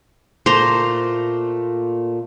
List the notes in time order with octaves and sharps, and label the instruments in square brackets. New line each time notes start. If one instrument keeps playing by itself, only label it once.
[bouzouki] A#2 A3 [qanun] C5 A#5